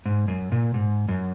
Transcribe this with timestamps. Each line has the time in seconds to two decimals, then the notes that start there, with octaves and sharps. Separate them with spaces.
0.06 G#2
0.28 F#2
0.52 A#2
0.74 G#2
1.08 F#2